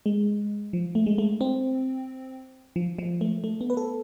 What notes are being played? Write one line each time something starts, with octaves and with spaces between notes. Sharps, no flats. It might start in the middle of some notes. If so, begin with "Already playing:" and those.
G#3
F3
A3
G#3
A3
C4
F3
F3
A3
A3
B3
B4
A4